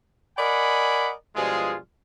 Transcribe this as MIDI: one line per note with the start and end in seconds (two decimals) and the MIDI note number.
0.38 1.13 70
0.38 1.13 74
0.38 1.13 75
0.38 1.13 78
0.38 1.13 80
0.38 1.13 83
1.35 1.77 43
1.35 1.77 47
1.35 1.77 53
1.35 1.77 56
1.35 1.77 65
1.35 1.77 68